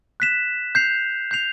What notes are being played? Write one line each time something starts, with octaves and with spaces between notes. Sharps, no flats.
F#6 B6 E7
G6 C7 F7
G6 C7 F7